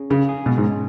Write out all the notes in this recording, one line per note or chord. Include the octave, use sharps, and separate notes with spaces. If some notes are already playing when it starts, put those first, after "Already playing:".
Already playing: C#4 G#4
C#3 G#4
G#4
B2 G#3
G#2
C#4